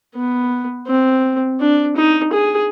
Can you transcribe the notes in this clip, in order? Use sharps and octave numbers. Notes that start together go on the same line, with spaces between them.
B3
C4
D4
D#4
G#4